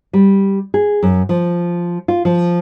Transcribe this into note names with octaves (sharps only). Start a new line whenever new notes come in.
G3
G#4
F#2
F3
F4
F3